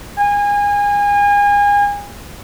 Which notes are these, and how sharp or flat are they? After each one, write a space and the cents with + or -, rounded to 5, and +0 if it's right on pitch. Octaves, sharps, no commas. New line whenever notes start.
G#5 -30